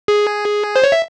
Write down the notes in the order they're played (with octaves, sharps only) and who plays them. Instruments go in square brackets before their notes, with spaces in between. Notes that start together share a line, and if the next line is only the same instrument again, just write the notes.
[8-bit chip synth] G#4
C5
C#5
E5